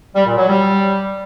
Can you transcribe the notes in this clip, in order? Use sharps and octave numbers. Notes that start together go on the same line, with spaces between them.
G3
A#2
F#3
G3